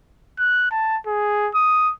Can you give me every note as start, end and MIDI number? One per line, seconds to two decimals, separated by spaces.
0.38 0.68 90
0.71 0.98 81
1.07 1.50 68
1.55 1.92 87